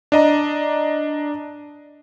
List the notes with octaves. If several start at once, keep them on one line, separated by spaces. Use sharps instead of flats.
D4 D#5 A#5